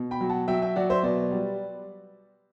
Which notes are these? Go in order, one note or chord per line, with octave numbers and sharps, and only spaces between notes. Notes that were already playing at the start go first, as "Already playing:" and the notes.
Already playing: B2
G5 B5
F#3
F#5 A5
F#3 E5 G5
E5 G5
F#3 D5 F#5
C5 E5
B2 B4 D5
G3